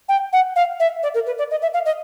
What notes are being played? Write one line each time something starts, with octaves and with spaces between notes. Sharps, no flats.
G5
F#5
F5
E5
D5
A#4
B4
D5
D#5
E5
F5
D#5